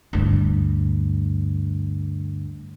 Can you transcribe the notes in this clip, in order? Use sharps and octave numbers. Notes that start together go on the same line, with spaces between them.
D2 G2